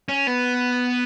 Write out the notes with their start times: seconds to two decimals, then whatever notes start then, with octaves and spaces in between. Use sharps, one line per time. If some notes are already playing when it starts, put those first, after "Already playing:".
0.08 C#4
0.27 B3